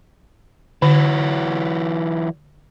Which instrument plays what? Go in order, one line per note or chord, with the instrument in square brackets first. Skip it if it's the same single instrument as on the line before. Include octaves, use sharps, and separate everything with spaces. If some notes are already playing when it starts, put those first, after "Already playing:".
[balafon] D3 [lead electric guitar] E3 F#3